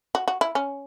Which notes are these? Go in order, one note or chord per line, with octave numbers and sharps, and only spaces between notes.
F#4
F#4
E4
C#4